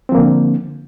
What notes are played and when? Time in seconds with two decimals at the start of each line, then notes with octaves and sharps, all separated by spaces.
0.09 C4
0.12 F3
0.15 A#3
0.17 D3